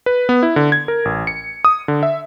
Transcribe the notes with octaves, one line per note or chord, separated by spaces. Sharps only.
B4
B3
E4
D3
G#6
A#4
A1
C#7
D#6
D3
E5